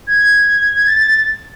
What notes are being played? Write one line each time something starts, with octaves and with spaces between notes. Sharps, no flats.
G#6
A6
A6